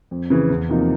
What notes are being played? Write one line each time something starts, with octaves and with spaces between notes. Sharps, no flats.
F2
C#3 E3
E2
C3 F3 A#3 D#4